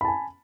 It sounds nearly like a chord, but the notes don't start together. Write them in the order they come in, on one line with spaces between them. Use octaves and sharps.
B5 A5 G#5